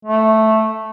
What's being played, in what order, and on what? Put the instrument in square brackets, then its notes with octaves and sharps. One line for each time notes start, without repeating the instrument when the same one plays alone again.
[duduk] A3